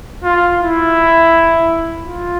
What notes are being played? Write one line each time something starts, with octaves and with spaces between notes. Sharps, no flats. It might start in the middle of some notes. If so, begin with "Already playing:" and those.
F4
E4
F4